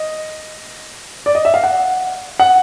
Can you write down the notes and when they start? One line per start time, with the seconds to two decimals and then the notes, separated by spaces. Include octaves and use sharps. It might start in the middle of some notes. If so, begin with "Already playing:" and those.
Already playing: D#5
1.26 D5
1.35 D#5
1.45 E5
1.54 F5
1.63 F#5
2.40 F#5